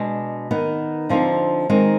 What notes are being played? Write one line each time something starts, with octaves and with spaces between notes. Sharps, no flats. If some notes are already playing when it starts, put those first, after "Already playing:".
Already playing: B2 G#3 D4
D#3 B3 D#4
D3 F3 C4 D#4
D#3 G#3 C4 D#4